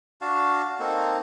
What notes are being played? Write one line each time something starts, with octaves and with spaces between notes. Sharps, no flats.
D4 F#4 F5 A5
A#3 C4 D#4 A4